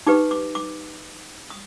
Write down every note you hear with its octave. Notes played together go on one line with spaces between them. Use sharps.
D#4 G4 B4 D6
D6
D6
D#6